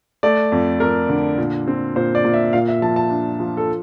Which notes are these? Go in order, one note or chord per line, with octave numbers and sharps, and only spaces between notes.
A3 D5
F2
F2 A#4
D3
A#2
C4
A#2 C5
D5
A#2
E5
A#2 F5
E5
F3 A5
A5
D4
F3
A4